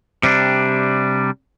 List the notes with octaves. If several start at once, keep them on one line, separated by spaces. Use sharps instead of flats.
C3 G3 D4